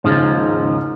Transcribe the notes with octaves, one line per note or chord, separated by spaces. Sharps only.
D#2 G#2 C#3 F3